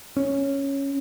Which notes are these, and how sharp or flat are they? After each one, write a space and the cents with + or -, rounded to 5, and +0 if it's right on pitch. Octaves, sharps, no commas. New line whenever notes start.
C#4 -5